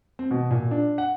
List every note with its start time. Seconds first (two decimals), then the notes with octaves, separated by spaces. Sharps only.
0.19 C4
0.31 B2
0.51 A#2
0.71 D4
0.98 F#5